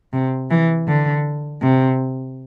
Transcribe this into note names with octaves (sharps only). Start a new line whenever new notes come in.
C3
E3
D3
C3